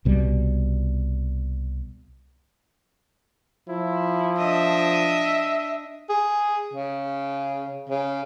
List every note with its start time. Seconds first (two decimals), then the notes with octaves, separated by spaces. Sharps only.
0.05 C2 B2 G3
3.69 F3 E4
4.38 D4 D#5 E5
6.09 G#4
6.73 C#3
7.89 C#3